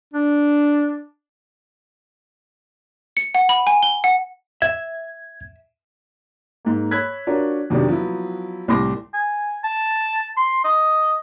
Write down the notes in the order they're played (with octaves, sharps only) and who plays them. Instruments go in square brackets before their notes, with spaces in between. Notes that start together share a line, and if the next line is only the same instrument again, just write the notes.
[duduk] D4
[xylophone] C#7
F#5
B5
G#5
G7
F#5
[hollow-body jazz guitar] E5 [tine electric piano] G#6
[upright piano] G#2 A#3
C#5 B5 E6 F#6 G#6 B6
D4 F4 F#4 A#4 C#5
F2 C3 D#3 F#3 B3 D4
F3 F#3 B3 E4
C2 A2 C6 D6 A#6
[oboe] G#5
A5
C6
D#5